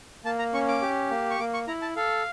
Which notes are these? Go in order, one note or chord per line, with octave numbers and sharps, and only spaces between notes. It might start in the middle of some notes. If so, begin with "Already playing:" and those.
A#3 A5
A#5
C#4 C#6
D6
G4
A#3
C#6
A#3 D6
C#6
E4 A#5
A5
A4 F5